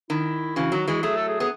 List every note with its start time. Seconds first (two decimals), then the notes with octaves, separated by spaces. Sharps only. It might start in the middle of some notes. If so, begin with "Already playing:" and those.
0.10 D#3 E4
0.56 C#3 E3 F#4
0.72 D#3 F#3
0.87 E3 G#3
1.02 F#3 A3 G#4
1.16 A4
1.28 G#4
1.40 B3 G#4